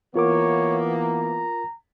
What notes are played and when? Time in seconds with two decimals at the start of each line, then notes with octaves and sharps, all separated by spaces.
0.16 E3 A#3 B3 F4 A#4 C#5 D6
0.94 A#5